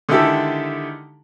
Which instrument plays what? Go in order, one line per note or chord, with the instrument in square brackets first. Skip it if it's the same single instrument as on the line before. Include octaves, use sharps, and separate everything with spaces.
[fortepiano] D3 D#3 G#3 E4 G4 A4